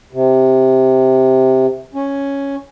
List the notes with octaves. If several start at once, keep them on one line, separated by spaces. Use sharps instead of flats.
C3
C#4